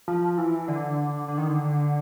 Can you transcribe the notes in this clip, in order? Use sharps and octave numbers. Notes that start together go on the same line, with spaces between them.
F3
E3
D3
D3
D#3
D3